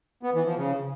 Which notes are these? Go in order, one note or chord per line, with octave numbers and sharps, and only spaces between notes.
B3
E3
F3
C#3